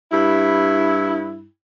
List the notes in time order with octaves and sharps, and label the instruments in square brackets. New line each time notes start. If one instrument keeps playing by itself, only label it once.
[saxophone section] G2 E4